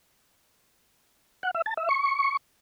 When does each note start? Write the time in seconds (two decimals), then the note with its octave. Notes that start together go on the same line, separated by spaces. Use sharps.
1.43 F#5
1.55 E5
1.66 A5
1.77 E5
1.89 C#6